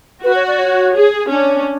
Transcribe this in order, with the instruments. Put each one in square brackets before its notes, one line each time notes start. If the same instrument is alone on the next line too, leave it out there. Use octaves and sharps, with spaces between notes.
[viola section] F#4 [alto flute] B4
[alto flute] C#5
D5
C#5
[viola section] G#4
[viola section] C#4 [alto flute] D4